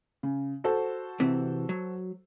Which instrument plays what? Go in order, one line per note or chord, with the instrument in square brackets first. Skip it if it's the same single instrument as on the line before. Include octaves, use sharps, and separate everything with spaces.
[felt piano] C#3
F#4 A4 C5
[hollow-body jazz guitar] C3 E3 C4
F#3